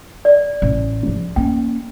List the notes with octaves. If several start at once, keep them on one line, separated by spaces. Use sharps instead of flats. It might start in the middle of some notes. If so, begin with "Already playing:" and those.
D5
A1
F3
A#3 C#4 G5